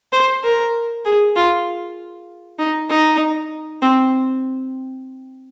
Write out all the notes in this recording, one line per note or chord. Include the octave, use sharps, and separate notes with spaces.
C5
A#4
G#4
F4
D#4
D#4
C4